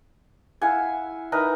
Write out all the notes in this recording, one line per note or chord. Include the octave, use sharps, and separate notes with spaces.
E4 F5 F#5 G#5
D#4 A#4 B4 E5